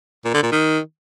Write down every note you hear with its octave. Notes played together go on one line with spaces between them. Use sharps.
A#2
D3
A#2
D#3